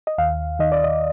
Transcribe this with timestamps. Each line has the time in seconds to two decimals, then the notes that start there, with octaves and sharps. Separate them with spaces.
0.07 D#5
0.18 D#2 F5
0.59 D#3 D#5
0.72 D5
0.84 D#5